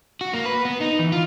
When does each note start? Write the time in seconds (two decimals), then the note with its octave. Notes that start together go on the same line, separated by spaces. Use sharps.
0.21 F#4
0.33 A#3
0.46 B4
0.65 B3
0.81 D#4
0.99 E3
1.12 F4